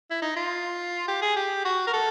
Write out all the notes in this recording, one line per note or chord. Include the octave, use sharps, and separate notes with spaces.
E4
D#4
F4
G4
G#4
G4
F#4
A#4
A4